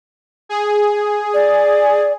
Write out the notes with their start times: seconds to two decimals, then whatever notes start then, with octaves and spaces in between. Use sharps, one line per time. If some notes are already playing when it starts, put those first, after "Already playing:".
0.49 G#4
1.34 D5